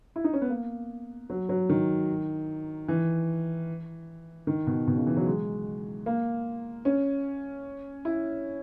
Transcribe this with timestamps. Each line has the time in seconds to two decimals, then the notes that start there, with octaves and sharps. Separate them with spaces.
0.16 E4
0.24 D#4
0.33 C#4
0.41 B3
0.50 A#3
1.30 F#3
1.49 F#3
1.69 D#3
2.88 E3
4.47 D#3
4.67 B2
4.87 B2
4.97 C#3
5.06 E3
5.17 F#3
5.27 G#3
6.06 A#3
6.85 C#4
8.05 E4